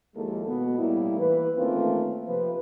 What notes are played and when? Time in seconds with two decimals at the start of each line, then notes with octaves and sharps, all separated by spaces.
0.15 D#2 F3 G#3 A#3 E4 A4
0.47 B2 B3
0.77 A2 G3 A#3 E4
1.18 E3 B4
1.57 D#3 A3 A#3 C4 C#4 F4
2.28 C3 F3 B4